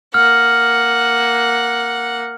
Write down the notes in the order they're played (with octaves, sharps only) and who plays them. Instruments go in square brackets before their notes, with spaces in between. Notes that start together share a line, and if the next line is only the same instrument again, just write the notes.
[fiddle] A#3 F#5 [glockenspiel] F6